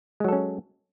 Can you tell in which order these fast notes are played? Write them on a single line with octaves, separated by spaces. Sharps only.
G#3 F#3 A4 C#4